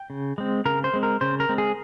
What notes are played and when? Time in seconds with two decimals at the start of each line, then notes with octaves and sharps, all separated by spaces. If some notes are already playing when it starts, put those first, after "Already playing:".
Already playing: G5
0.10 C#3
0.38 G#3 C4
0.65 C#3 A#4
0.84 C5
0.94 G#3 C4
1.03 A#4
1.21 C#3 C5
1.40 A#4
1.49 G#3 C4
1.58 G#4